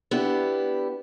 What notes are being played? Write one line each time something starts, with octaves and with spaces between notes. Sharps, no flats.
B3 D4 E4 G4